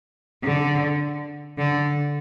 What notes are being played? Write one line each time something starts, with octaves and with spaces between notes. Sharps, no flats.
D3
D3